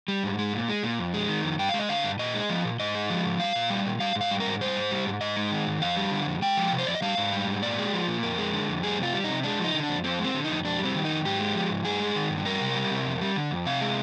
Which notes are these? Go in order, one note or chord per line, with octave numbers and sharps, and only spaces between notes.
G3
G#2
G#3
A#2
G#3
A#2
F2
G#3
D#3
F2
G2 G5
G#3 F5
D#5
D3 F5
G2
A#2 D#5
G#3
F3
A#2
G#2 D#5
G#3
F3
G#2
G3 F5
A#2
G3
A#2
G3 F5
G#2
F5
G3
A#4
G#2
G3 C5
G#2
G3
G#2
G#2 D#5
G#3
D#3
G#2
F2 F5
G3
D3
F2
G#3 G5
F3
C3
C5
F2 D5
D#5
G3 F5
G#2
G3
G#2
A#2 D5
G#3
F3
A#2
F2 A#4
G#3
D3
F2
G3 G#4
C3 F4
G3
D#4
C3
G#3 D4
F3
D#4
D3
D4
F2
F2 C4
G#3 C4
D3
D#4
F2
F2 D4
G3
C4
D#3
D#4
F2
G#2 G4
G#3
F3
G#2
G2 G#4
G#3
D#3
G2
G3 A#4
C3
G3
C3
F2
G3
D3
F2
C3 F5
G#3